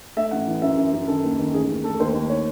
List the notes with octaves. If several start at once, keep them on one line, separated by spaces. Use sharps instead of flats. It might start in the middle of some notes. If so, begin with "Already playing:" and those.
A3 E5
A1 F#5
E3
F#2 E5
F#2
F#2
D#3 A4
D#2
D#2
A1 G#4
A1
A3 A4
D#2 C5
D#2
C#5